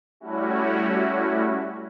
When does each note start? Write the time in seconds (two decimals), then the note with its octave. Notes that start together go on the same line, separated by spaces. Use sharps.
0.20 G3 A3 C#4 E4 F#4